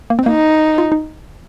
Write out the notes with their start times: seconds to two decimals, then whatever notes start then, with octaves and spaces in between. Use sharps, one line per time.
0.10 A#3
0.19 C4
0.26 A#3 D#4
0.78 F4
0.92 D#4